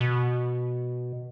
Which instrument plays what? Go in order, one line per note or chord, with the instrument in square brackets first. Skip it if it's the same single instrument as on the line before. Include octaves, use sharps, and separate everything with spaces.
[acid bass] B2